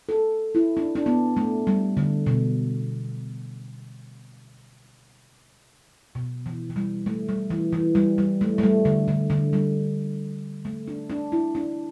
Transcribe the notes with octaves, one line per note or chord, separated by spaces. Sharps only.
A4
E4
D4
D4
B3
A3
G3
D3
B2
B2
E3
E3
G3
A3
G3
E3
E3
G3
G3
A3
A3
G3
D3
D3
D3
G3
A3
D4
D4
E4
D4